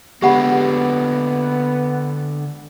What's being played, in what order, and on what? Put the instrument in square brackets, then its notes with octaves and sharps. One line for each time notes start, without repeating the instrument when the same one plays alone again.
[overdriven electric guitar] D3 G#3 [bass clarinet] B3 [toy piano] G4 F#5 B5